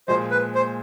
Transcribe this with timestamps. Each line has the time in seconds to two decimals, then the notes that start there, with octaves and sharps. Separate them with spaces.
0.08 A#2 F3 G#3 C5
0.31 B4
0.55 C5